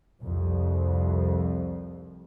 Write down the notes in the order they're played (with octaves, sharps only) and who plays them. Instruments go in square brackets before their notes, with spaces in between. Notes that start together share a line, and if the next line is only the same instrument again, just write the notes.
[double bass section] C2 F2